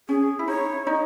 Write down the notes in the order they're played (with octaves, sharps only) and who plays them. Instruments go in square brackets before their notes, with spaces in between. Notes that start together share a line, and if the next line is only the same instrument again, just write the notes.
[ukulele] C#4 [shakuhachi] G#4
[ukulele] E4
[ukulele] D#4 [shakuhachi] C#5
[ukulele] D#4 [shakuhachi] D#5